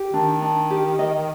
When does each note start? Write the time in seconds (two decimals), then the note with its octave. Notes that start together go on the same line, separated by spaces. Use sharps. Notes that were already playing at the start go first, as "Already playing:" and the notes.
Already playing: G4
0.13 D#3 D4
0.42 D4
0.71 G4
0.99 D#5